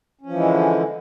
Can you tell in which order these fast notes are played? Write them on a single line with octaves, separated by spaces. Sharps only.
C#4 F3 E3 G#3 D3